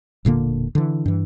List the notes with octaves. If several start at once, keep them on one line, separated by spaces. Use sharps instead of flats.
E1 A#2 D3 A#3
D3 E3
G2 E3